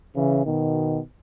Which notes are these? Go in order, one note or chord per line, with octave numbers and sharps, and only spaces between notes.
C#3 E3
B2 D#3